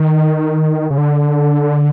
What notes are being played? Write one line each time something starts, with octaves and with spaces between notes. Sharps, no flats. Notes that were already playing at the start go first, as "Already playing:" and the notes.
Already playing: D#3
C#3
D3